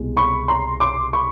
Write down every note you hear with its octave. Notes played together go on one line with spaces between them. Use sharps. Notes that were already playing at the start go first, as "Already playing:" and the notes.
Already playing: C2 B2 G#3
B5 C#6
A#5 C6
C6 D6
B5 C#6